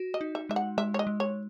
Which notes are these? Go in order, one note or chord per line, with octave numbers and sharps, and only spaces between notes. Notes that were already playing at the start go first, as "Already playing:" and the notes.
Already playing: F#4
D#5
D#4
E5
G#3 E5
F#5
G#3 E5
C#5
D#5
G#3
C#5